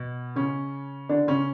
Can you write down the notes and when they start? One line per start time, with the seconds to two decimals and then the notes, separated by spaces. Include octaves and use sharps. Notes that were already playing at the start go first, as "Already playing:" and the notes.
Already playing: B2
0.36 C#3 C#4
1.09 D3 D4
1.27 C#3 C#4